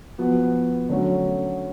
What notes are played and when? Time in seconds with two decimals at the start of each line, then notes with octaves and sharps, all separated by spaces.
0.18 F3 B3 F#4
0.89 D3 F#3 A3 C#4 F#4